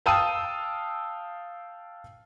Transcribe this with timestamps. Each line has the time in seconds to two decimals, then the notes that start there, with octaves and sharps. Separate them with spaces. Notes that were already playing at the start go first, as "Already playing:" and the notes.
0.06 F5 G5 A5 D#6 E6 D#7